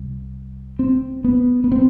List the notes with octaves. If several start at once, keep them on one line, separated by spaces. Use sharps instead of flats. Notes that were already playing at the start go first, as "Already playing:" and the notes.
Already playing: C2
C4
B3
B3
C4